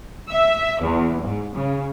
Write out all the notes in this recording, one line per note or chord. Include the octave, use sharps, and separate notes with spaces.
E5
E2
G#2
C#3